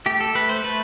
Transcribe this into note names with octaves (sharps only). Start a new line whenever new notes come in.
A3 G4
A4
A3 B4
C5
A3 B4